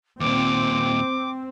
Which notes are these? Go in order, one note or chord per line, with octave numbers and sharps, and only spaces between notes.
D#2 A#2 C4 D6